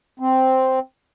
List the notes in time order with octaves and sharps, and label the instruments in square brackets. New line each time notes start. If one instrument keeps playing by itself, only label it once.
[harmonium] C4